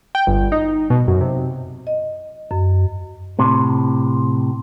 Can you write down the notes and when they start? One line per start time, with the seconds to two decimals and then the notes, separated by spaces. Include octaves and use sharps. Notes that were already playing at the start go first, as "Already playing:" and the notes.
0.15 G5
0.27 G1
0.52 D#4
0.90 B2
1.07 F#2
1.21 C3
1.87 D#5
2.51 F#2
3.39 A2 C3